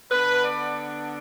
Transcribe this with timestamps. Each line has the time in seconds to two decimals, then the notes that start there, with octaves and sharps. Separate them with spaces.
0.11 D3 B3 D4 B4
0.44 D5